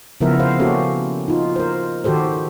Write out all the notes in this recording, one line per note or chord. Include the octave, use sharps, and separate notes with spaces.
C#3 F3 B3 E4 A#4 E5
C5 F5
A#3 C#4 F#4 G4 A4
D#4 F4
A#4 C5
D#3 F#4 G4 A4 C5